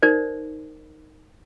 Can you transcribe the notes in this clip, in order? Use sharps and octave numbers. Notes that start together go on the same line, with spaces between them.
D#4 A#4 C5 D5